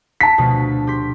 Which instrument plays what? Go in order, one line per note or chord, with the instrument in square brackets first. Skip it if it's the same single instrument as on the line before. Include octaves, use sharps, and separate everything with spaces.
[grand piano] A5 B6
[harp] D2 B2 F3
G4 C6 B6